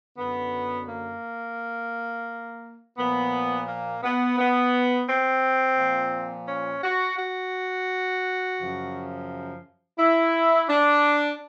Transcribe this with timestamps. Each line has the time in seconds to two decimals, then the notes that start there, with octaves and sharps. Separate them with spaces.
0.17 F#2 D3 F#3 B3
0.88 A#3
2.97 A#2 F3 B3
3.67 A#3
4.03 B3
4.38 B3
5.08 C4
5.78 A#2 F3
6.48 C#4
6.83 F#4
7.18 F#4
8.58 F#2 C#3 F3
9.99 E4
10.68 D4